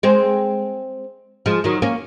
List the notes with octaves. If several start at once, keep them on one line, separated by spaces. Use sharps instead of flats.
G#3 C4
F3 G#3
D#3 F#3
A#3 C#4